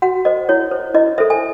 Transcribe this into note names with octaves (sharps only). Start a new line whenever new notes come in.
F#4 F#5
C5 D#5
E4 C#5
C5
E4 D#5
A4 C5 E5
G#5